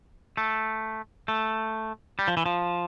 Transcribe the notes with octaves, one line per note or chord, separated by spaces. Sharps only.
A3
A3
G3
F3
E3
F3